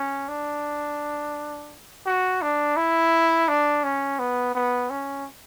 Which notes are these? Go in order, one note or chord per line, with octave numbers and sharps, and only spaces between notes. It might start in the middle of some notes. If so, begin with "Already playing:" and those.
Already playing: C#4
D4
F#4
D4
E4
D4
C#4
B3
B3
C#4